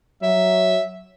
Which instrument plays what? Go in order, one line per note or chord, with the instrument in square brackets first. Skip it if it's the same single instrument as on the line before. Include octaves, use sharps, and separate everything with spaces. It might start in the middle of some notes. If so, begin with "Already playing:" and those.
[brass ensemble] F#3 [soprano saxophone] E5